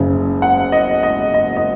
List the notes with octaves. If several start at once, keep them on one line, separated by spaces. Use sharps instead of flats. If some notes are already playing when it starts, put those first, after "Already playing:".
Already playing: F#1 F#2 C#3
F#5
D#5
D#5
D#5
D#5